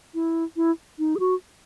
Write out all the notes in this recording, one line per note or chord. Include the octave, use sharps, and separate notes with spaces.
E4
E4
D#4
G#4
F#4